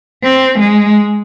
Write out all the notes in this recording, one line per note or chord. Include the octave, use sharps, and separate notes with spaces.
C4
G#3